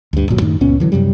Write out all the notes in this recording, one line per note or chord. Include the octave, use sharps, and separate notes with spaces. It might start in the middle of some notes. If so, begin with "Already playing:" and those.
D2 G2
D1 G1 A#2 F#3
F#2 A2 D#3
C#2 A#2 B3 C#4
D3 E3 F#3
F#2 C3 F#3 G3